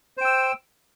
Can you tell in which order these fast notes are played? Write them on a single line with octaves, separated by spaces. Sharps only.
C5 G5 E6